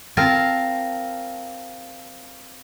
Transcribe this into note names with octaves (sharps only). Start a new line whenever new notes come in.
C4 F4 A#4 A5